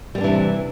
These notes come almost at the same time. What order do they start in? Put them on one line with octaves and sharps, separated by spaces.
G3 B3 D4 E3 C3